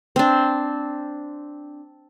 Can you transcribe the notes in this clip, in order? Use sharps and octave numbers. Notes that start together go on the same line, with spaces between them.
C4 D4